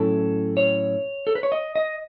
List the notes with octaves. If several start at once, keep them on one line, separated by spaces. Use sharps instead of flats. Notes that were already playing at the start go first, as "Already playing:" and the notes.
Already playing: A2 F#3 C#4 E4 A4
C#5
A4
B4
C#5
D#5
D#5